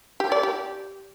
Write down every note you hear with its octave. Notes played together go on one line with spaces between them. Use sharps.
G4
D5
G4